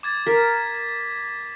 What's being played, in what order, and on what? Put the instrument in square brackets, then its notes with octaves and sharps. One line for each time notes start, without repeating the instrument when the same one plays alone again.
[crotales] D6 G#6 A6
[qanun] A#4 [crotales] B6